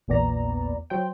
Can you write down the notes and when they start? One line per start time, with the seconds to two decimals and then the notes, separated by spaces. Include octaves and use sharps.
0.08 A#1 E2 A#2 B3 D5 A#5
0.90 F#3 C5 G5